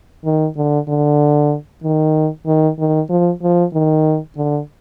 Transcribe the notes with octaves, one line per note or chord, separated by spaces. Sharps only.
D#3
D3
D3
D#3
D#3
D#3
F3
F3
D#3
D3